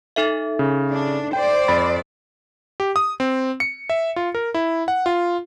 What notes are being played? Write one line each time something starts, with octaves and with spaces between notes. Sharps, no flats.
D#4 A4 E5
C#3
D4
C5 D5 G5
F2 B5 A6
G4
D#6
C4
C#7
E5
F4
A#4
E4
F#5
F4